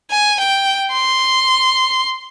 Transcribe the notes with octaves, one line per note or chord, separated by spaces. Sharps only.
G#5
G5
C6